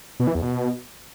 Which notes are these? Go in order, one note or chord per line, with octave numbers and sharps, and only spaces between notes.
B2
E3
E2
B2